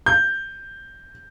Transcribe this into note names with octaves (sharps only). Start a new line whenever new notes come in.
G6